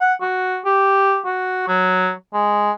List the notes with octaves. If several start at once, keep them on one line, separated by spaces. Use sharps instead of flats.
F#5
F#4
G4
F#4
F#3
G#3